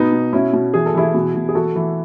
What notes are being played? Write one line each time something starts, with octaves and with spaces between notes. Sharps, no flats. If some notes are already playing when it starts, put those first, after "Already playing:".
Already playing: B2 B3 D#4
B2
B2 C#4 E4
B2
E3 G#4
A4
E3 E4 G#4
B2
B2
G#4
E3 F#4 A4
E3